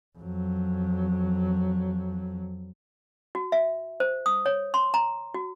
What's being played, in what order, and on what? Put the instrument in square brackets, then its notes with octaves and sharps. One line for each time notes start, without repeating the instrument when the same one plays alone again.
[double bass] F2 F#3
[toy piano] F#4
E5
C5
D#6
C#5
C6
A#5
F#4